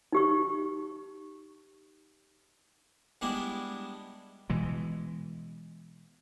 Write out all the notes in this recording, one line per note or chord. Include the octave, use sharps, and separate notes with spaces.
D#4 G4 C#6
G3 G#3 B3 D4 E4
B2 E3 G#3